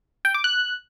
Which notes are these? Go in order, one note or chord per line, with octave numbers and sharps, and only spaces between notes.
G5
D6
F#6